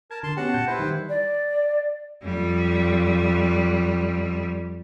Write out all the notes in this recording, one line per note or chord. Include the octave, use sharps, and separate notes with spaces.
A#4 A5 G#6
D3 A5 C6
B3 C#4 F#4 G4 F#5 A5
A#2 G6
E4 G4 B4 C5
D#3 G3 G4
D5
F2 G3